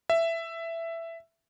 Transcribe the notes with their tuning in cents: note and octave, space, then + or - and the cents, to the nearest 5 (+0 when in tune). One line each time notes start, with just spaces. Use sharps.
E5 +10